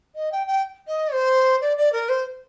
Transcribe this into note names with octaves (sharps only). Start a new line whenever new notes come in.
D#5
G5
G5
D#5
C5
D5
D5
A#4
C5